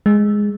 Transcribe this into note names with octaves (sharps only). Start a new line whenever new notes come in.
G#3